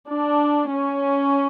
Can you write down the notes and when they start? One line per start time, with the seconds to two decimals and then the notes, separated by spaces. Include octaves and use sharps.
0.08 D4
0.72 C#4